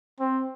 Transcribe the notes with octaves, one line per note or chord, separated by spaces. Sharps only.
C4